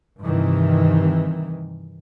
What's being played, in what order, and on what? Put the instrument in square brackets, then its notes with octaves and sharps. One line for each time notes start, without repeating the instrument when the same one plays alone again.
[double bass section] G2 C3 D#3 E3